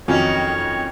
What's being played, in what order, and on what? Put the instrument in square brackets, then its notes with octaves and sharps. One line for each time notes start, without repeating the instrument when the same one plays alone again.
[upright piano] F2 F#3 D#5 [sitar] D#3 A#3 C#4 [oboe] C#5